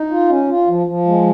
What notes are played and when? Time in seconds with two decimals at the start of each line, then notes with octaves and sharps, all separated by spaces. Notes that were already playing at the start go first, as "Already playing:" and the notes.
Already playing: D#4
0.10 F4
0.29 C#4
0.48 F4
0.68 F3
0.86 F3
1.06 G#3